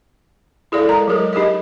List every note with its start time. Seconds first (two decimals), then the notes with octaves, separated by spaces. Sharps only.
0.72 E4 G#4 A4 D5 F5
0.89 G#3 A#4 A#5
1.08 F#3 G#3 G#4 A#4
1.33 D#4 G4 G#4 A#4 D#5